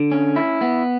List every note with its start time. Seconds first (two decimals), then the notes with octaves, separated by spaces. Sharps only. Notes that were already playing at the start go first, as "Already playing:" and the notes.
Already playing: D3
0.12 C#4
0.36 E4
0.61 B3